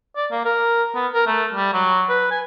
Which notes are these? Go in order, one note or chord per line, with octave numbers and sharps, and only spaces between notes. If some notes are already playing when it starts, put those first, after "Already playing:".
D5
A#3
A#4
B3
A#4
A3
G3
F#3
B4
G#5